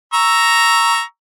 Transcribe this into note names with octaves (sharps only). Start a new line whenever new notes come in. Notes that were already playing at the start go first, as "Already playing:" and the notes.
A#5 C#6 E6